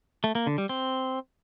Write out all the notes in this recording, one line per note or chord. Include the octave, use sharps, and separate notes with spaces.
A3
A#3
D3
G3
C4